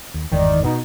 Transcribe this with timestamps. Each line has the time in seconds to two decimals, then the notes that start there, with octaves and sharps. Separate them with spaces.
0.14 D#2
0.31 G1 E2 G#2 D#3 D5
0.64 B2 D#4